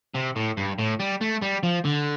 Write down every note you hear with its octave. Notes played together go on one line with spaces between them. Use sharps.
C3
A2
G2
A2
G3
A3
G3
F3
D3